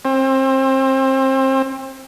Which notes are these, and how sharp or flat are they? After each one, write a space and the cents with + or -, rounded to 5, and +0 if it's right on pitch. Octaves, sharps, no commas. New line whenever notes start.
C4 +30